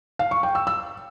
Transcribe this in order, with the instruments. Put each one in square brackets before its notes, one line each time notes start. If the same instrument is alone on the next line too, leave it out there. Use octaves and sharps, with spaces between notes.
[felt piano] F5
C#6
G5
E6
E6